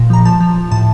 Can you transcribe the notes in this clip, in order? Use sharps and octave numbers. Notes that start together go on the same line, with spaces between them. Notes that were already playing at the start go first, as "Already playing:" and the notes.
Already playing: A#2
F3 A#5
F3 A5
F3
F3
A2 A5